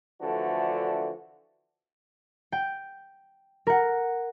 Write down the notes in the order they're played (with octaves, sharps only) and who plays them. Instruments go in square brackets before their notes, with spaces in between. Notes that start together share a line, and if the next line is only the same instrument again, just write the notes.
[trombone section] D3 E3 F3 A3 D4 F#4
[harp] G5
A#4 F#5